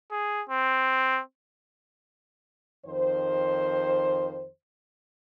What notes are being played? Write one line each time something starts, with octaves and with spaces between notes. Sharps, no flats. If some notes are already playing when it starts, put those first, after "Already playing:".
G#4
C4
F2 D#3 C5